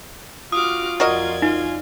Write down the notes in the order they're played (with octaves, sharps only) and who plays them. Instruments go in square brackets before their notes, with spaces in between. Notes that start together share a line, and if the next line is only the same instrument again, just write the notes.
[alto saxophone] F4 [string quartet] F#4 D6 F6 [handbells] D#6
[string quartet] F2 D5 G#6 [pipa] F#4 A#4 D#5
[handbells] D#4 [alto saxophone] F4